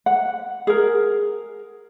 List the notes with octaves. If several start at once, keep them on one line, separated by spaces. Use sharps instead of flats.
F#5
G#4 A#4